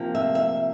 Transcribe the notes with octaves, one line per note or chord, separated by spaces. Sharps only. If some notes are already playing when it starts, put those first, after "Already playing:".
Already playing: C3 F3 A#3
E5
E5